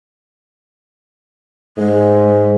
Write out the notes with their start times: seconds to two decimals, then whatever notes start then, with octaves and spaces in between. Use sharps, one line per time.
1.78 G#2 G#3